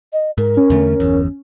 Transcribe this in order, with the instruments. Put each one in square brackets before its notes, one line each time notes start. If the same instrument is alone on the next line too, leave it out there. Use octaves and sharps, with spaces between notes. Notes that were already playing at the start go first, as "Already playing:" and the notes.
[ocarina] D#5
[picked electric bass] G#2 [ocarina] A#4
[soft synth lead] C#4
[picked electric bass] E2 D3 A3
G1 E2